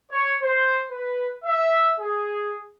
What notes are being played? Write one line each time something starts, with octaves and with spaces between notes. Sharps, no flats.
C#5
C5
B4
E5
G#4